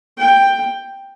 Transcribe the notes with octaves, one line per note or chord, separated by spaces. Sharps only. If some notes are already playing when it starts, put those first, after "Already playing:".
G5